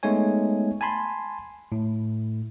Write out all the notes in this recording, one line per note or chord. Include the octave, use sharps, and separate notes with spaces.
G#3 A3 B3 D#4 C#5 G#5
G#5 A5 B5 C6
A2